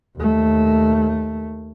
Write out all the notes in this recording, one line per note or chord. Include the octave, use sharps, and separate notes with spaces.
D#2 A3